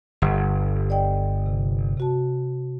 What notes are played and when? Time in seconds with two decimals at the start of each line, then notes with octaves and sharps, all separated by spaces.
0.22 G1
0.90 D5 D#5 G5
1.46 C3
1.98 C3 F#4 A5